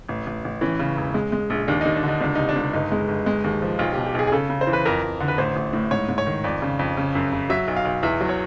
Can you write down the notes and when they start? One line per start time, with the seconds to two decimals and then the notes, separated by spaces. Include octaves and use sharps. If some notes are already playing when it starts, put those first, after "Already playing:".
0.09 A1
0.26 A1
0.44 A1
0.61 E3 C#4
0.79 C#3
0.97 E1
1.14 G#3
1.32 G#3
1.50 A#1
1.68 D#2 D4
1.81 D#2 D#4
1.95 D4
2.03 D3
2.08 D#4
2.21 C#2 D4
2.35 C3 D#4
2.49 D4
2.56 C#2
2.73 G1 D#4
2.92 G#3
3.08 G1
3.26 G#3
3.44 D#2
3.62 F3
3.79 B1 F4
3.93 G4
3.97 B2
4.06 G4
4.15 B1 G#4
4.27 G#4
4.32 C#3 A4
4.50 C#3
4.61 C5
4.67 E3
4.73 B4
4.85 F2 A#4
5.03 F2
5.20 D3
5.28 B4
5.38 A1 C5
5.56 A1
5.73 A2
5.91 G#2 C#5
6.09 G#2
6.18 C#5
6.26 D#3
6.44 F2 D5
6.62 C#3
6.79 F2
6.97 C#3
7.15 F#2
7.32 C#3
7.50 F#3 E5
7.68 B1
7.76 F5
7.85 B1
8.03 E2 E5
8.21 F#3
8.29 C#5